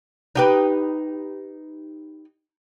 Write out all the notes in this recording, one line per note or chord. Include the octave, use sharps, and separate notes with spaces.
D#4 G4 B4